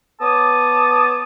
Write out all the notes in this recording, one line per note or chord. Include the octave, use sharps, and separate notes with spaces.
B3 C#5 A5 D6 D#6